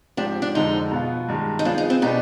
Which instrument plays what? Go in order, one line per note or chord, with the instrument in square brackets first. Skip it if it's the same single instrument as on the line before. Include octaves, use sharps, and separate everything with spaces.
[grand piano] G#2 F3 C4 G4 [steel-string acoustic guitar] D4
[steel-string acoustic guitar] D4
[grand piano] F2 D3 G#3 [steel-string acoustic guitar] D#4
[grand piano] B2 B3 F4
G2 D#3 G#3
[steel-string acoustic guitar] D#4
[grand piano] F3 B3 F4 G#4 [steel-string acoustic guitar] D4
[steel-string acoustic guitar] D#4
C4
[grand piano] B2 B3 D4 G4 [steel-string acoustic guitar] D#4